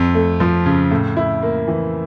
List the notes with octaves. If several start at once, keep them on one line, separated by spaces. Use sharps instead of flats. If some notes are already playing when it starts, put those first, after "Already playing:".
Already playing: F2
A3
F3
C#3
A2
E4
A#3
E3